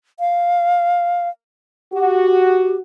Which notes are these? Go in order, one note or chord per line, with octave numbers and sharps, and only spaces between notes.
F5
F#4 G4